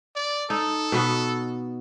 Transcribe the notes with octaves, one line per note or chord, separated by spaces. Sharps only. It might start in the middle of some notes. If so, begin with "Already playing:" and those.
D5
D#4 A4
B2 B3 F#4